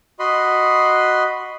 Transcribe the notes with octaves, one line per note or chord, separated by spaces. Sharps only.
F#4 D#5 B5 C6